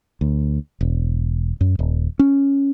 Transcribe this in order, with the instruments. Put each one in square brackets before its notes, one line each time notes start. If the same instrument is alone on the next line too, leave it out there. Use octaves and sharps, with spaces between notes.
[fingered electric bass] D2
E1
F#2
D#1
C#4